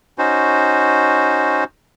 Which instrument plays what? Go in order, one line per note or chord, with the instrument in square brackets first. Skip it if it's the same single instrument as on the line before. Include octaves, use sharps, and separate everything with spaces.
[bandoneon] C#4 D#4 F#4 C5